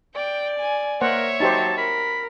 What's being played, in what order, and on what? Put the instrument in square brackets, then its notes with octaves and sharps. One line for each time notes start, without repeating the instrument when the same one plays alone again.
[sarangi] D5 [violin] G5
[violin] G#5
[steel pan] A#3 C5 F#5 [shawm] A#4 [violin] C#5 E5
[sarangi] F#3 [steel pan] D#4 G4 C5 [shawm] A5
[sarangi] A#4 [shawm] B5